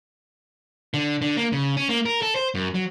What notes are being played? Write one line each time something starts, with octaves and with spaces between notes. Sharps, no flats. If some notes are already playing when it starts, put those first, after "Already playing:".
D3
D3
A#3
C#3
C#4
A#3
A#4
A4
C5
F#2
F#3